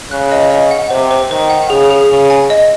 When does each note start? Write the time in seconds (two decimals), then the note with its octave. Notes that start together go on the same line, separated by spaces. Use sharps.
0.11 C#3 F#6
0.32 D#5
0.51 D#5
0.71 F#5
0.90 C3 C5
1.11 C5
1.31 D#3 C5
1.50 F#5
1.70 C#3 G#4
1.90 G#4
2.09 C#3 G#4
2.30 G#5
2.50 D#5